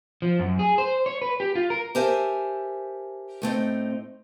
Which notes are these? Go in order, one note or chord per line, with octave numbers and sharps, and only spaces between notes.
F3
F#2
G#4
C5
C#5
B4
G4
F4
A#4
G4 A#4 C5 E5 G#5 A5
A2 A3 C4 D#4